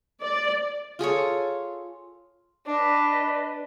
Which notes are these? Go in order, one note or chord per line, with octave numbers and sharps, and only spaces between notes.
D5
F4 G#4 A4 C#5
D4 B4 D5 D#5